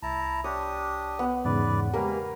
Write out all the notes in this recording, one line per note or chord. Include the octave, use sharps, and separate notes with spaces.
C2 E4 A5 A#5
D4 G4 C#5 D#6
B3
E2 G#2 C#3 B4 D5
G#3 A#3 C#4 G4 A#4 B4 F5